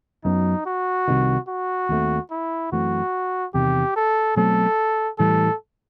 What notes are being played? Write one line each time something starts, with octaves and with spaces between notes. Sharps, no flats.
F#2 F#3 B3 D#4
F#4
C2 C3 D#3
F#4
D#2 D#3 A3 C4
E4
F#2 E3 A3 C4 F#4
E2 C3 D#3 G4
A4
B2 F#3 A3 C4 A4
A2 E3 G3 A4